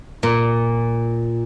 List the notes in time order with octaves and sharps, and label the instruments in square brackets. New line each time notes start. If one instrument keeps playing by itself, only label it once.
[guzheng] A#2